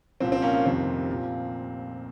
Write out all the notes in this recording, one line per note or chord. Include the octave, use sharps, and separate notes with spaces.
C2 A#2 F3 C4
C4
A#3 C#4
A#3
F1 F2 C3 D#3 C4
A#2 F3